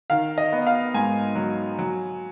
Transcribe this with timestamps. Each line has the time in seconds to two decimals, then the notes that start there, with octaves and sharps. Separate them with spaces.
0.10 D#3 F5
0.38 D#5
0.52 B3
0.67 F5
0.94 G#2 G#5
1.36 F#3
1.79 F#3